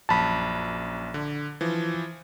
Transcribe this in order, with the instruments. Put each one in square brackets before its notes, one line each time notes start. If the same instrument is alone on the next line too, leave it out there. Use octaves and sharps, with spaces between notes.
[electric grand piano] A#1 F#2 [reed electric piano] A5 B5
[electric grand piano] D3
E3 F3